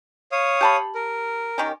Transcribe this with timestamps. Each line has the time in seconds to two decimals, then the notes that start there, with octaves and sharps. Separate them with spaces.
0.32 C#5 F5 D#6
0.61 G4 A5 B5
0.95 A#4
1.58 D#3 C#4 G4